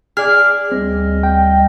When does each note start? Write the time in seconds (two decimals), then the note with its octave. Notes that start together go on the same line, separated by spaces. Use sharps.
0.17 G#4 D5 F6
0.72 D2 G3 C4 D#5
1.23 G5